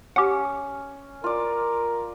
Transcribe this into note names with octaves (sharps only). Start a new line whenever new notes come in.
C#4 G4 F#5
F4 A#4 D5